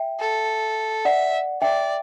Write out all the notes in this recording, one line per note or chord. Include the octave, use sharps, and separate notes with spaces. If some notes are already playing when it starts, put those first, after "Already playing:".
Already playing: E5 G5
A4
D5 E5 F#5
D5 E5 G5